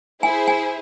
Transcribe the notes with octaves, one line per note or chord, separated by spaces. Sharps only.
E4 G#4 C5 G#5
G#5